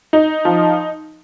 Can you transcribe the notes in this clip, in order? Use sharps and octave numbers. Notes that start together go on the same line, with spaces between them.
D#4
F3